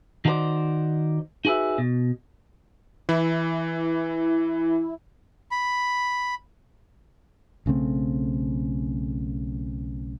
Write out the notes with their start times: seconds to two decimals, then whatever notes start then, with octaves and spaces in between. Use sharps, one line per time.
0.25 D#3 D#4 F#4 G#4 C5 D5
1.45 D#4 F#4 G#4 B4 E5
1.78 B2
3.09 E3 E4
5.51 B5
7.66 B1 C#3 A3 C4